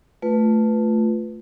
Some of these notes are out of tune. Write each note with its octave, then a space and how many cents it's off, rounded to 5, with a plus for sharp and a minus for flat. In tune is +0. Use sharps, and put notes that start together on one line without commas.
A3 +0 F4 +0 B4 +0